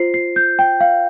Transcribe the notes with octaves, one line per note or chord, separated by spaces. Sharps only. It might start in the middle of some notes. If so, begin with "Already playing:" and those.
Already playing: F4 C5 C7
C7
G6
G5
F5